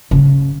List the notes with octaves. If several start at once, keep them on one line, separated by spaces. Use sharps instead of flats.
C#3